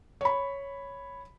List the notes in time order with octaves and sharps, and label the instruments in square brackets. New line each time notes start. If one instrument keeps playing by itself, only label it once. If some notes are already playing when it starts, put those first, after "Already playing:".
[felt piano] C#5 B5